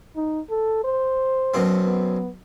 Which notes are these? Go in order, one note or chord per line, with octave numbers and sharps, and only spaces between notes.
D#4
A4
C5
F#2 B2 C4
B3